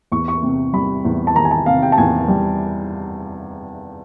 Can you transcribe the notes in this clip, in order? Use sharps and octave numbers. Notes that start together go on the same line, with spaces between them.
E2 C#6
C#6
C3
G3 B5
E2
A5
D#3 A#5
G#5
A5
C3 F5
G5
A5
E2 G#5
G3